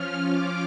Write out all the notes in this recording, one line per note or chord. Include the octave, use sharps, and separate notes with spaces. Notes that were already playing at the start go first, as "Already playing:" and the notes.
Already playing: F3 C#4 F4 F6
D6